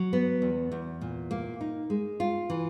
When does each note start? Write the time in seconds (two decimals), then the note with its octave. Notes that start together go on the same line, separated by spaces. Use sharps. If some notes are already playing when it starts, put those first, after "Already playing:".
Already playing: F#3
0.13 B3
0.42 E2
0.72 E2
1.01 A#2
1.31 A#3
1.61 D#4
1.90 G#3
2.20 F4
2.50 E3